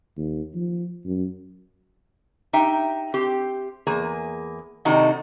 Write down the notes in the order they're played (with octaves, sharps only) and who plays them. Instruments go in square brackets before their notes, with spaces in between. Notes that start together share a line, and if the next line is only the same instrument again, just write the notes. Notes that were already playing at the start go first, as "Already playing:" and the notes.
[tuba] D#2
F3
F#2
[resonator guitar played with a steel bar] D#4 G4 E5 G5
C4 G4
E2 A#3 G#4
C3 D#3 A3 D4 D#4 F#4